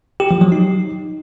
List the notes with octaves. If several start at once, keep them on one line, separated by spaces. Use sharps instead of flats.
G4
F3
F#3
D#4